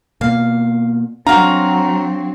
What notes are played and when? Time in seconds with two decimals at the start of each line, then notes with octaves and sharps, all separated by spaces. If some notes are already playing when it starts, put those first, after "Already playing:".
0.21 B2 A#3 F5
1.27 F#3 C4 D4 F#4 F5 A#5